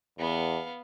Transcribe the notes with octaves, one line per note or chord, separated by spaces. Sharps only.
E2 B3 F5